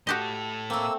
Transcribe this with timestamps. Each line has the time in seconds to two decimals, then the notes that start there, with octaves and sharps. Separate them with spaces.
0.07 A2 F#4 G4 A4 D#5
0.70 A3 A#3 C4 E6